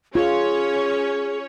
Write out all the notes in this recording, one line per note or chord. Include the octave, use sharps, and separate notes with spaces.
C#4 F4 G#4 C#5